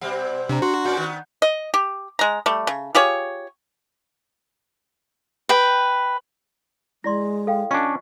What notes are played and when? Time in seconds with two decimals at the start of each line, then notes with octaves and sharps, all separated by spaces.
0.02 B2 G3 C4 F#5
0.49 C3 D4 D5 A#5
0.62 F#4 C6
0.85 A#2 C#4 D5 F#5 G6
0.98 D#3 B3
1.42 D#5
1.74 G4
2.19 G#3 A#5
2.46 G3 A3
2.67 C#3
2.95 F4 G4 G#4 C#5
5.49 B4 G5
7.04 G#3 E4 D5 C6 A#6
7.47 A4 F5 G5
7.71 C#4 D4 F4 D#5 C#6